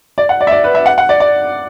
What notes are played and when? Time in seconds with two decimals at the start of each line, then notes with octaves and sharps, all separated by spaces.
0.18 D5
0.29 F#5
0.41 D5
0.47 E5
0.51 D5
0.64 B4
0.75 E5
0.86 F#5
0.98 F#5
1.09 D5
1.20 D5